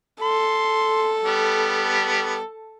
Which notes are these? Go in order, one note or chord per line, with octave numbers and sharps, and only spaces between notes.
A4 C6
G3 B3